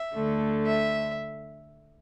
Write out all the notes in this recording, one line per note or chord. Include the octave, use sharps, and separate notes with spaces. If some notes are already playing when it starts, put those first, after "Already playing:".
Already playing: E5
D2 D3 A3
E5